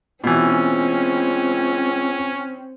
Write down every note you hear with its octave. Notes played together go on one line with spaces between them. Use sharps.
C#2 B2 E3 C4 C#4